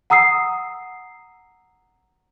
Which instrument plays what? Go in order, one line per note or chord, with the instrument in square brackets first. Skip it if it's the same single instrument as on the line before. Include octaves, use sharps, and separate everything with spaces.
[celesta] F#5 A#5 D#6 E6 C7